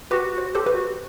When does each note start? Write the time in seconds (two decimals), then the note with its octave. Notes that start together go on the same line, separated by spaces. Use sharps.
0.10 F#4 G4 B4
0.32 F#4
0.38 C5
0.53 G4 A4 C5
0.66 G4 B4
0.73 F#4